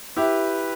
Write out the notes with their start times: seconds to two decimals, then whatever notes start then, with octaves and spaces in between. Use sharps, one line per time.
0.16 E4 G4 B4